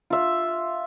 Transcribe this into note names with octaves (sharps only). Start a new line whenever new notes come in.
F4 E5